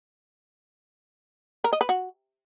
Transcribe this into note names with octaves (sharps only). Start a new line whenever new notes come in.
A#4
D#5
B4
F#4